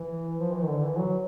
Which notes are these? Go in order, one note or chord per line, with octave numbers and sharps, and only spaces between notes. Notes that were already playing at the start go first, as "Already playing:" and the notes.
Already playing: E3
F3
E3
D#3
D3
E3
F#3